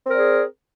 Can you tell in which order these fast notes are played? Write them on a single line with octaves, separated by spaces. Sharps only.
C4 A#4 D5 G#4